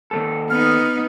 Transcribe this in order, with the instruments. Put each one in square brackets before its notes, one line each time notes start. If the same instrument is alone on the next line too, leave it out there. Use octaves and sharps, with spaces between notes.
[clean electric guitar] D#2 G#2 A4
[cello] B3 D#4 [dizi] F6